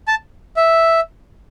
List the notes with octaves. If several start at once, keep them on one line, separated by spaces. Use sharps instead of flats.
A5
E5